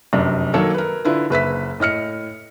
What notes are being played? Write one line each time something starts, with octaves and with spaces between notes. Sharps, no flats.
F1 F#2 D4
D#3 F#3 A#3 A4 C#5
A#4 B4
D3 E4 F4 B4
F#1 B4 E5 B6
A2 D#5 F6 C#7